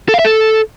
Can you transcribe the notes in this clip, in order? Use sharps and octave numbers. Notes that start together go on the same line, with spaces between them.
A4
F5
E5
A4